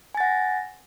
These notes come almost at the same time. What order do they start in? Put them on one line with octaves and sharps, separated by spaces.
G#5 A6 F#5 A#6